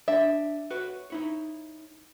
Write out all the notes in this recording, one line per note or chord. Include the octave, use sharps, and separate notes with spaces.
D4 E5
F#4 B4 C#5
D#4 E4 C#5